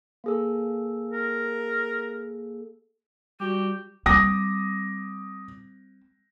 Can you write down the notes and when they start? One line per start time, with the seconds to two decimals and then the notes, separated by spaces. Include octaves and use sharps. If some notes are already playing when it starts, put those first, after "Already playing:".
0.24 A#3 G#4 A4
1.13 A#4
3.40 G3 F#4 G4
4.06 G3 C4 D6 D#6 A#6